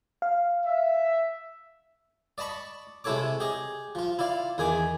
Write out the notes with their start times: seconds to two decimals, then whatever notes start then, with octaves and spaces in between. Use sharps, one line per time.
0.22 F5
0.66 E5
2.38 D5 D#5 A5 B5 C#6
3.04 C3 G#3 E4 A4 C#5 D6
3.40 G4 G#4 D#5
3.95 F3 F4
4.19 E4 F4 D5 F5
4.58 E2 D#3 G#4 G#5 D6